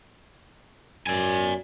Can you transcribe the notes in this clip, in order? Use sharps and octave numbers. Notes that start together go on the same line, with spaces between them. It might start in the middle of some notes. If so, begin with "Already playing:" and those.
F#2 D5 G#5